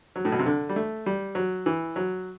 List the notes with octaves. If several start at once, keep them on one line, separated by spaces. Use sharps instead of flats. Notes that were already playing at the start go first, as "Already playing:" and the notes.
F#3
A2
B2
C3
D3
G3
A3
G3
F#3
E3
F#3